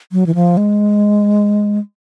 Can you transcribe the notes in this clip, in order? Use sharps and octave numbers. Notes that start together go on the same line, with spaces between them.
F#3
E3
F3
G#3